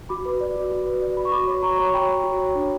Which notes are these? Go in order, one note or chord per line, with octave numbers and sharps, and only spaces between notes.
F#4 B5 D6
B4
D5
F#4
F#4
B4
D5
F#4 B5
C#6
F#4 B5 D6
C#5
F#4 A#5 C#6
C#5
F#4 G5 B5
C#5
F#4
C#5
D4